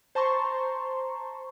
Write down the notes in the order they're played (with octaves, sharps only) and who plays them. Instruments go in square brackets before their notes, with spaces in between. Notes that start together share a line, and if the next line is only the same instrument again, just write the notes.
[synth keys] C5 A5 A#5 C6 C#6